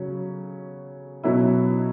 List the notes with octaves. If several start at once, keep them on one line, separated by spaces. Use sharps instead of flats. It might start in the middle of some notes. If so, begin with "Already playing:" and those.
Already playing: C#3 F#3 C#4
B2 F#3 C#4 E4